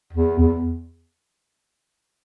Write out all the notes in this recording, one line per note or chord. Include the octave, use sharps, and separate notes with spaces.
E2
E2